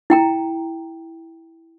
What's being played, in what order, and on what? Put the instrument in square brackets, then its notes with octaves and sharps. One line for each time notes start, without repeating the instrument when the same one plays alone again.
[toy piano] E4 G5 A#5